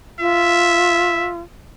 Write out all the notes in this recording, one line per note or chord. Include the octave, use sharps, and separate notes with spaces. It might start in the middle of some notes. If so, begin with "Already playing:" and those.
F4 E5